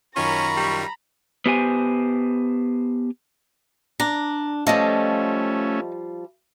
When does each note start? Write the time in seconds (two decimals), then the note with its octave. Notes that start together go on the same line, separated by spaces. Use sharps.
0.16 F#2 D#3 C#4 F4 A#5 B5 C#6
0.57 G3
1.46 B3 G4 C5 G#5
4.00 D4 A#5
4.67 F3 G3 A3 C#4 A4 D#5